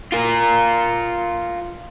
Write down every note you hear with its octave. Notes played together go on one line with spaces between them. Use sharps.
F4 A#4